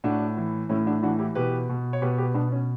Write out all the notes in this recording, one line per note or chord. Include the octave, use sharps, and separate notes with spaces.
A2 D4 F#4
E3
A2 C#4 E4
D4 F#4
E3 D4 F#4
E4 G4
B2 G4 B4
B2
C#5
B2 G4 B4
G4 B4
B2 B3 D4
C#4